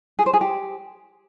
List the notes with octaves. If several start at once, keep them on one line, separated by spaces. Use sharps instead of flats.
G#4
C5
G#4
G4